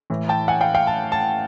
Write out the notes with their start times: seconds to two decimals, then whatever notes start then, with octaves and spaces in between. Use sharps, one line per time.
0.10 A2 E3
0.29 G5 A5
0.48 F#5 G#5
0.61 F5 G5
0.74 F5 G5
0.87 A5
1.12 A5